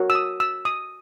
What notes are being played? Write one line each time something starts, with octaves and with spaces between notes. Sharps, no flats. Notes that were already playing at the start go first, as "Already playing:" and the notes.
Already playing: F#4 A#4 C#5
E6
D#6
E6
D#6